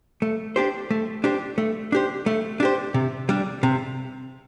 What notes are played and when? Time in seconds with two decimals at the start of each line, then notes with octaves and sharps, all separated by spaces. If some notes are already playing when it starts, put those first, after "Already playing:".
0.22 A3
0.56 D4 G4 C5
0.91 A3
1.24 D4 G4 C5
1.58 A3
1.92 D4 G4 C5
2.26 A3
2.60 D4 G4 C5
2.94 C3
3.29 G3 D4
3.63 C3